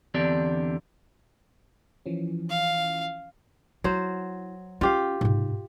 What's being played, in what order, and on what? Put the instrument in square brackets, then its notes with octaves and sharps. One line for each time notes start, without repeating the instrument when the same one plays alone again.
[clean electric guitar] E2 D3 C4 D4 G4 D5
[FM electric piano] E3 F3 C#4
[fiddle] F5
[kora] F#3 C5 [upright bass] E4
[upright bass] C#4 [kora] F4 G4 F5
[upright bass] G#2 C3